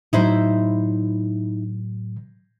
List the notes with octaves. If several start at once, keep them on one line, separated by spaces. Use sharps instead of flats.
A2 F#3 D#4 E4 C5